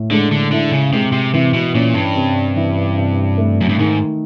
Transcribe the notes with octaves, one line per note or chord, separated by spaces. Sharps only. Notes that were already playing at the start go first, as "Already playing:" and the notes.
Already playing: A2
D3 G#3
D3
D3 E4
C#3
C3 G#3
C3
C3 E3
B2
A#2 C#4
G2
C3
E3
C3
A3
F#2
G2
G#2 D#3